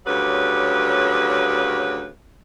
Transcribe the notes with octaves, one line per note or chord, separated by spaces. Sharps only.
D2 C#3 F#3 G3 B4